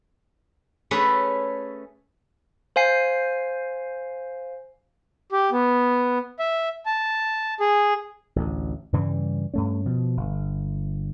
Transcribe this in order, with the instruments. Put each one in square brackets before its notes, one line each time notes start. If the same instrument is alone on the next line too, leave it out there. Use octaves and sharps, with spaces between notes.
[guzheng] A3 C#4 G#4 A4 B4
[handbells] C5 F5 G#5 C7
[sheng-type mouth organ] G4
B3
E5
A5
G#4
[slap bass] A1 D2
G2 C#3 E3 G3
G2 A3 C#4
B2 F3
G1